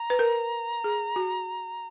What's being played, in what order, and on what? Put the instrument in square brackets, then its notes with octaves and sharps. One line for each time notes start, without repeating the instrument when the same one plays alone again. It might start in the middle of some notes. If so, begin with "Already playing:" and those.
Already playing: [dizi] A#5
[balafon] B4
A#4
G#4
F#4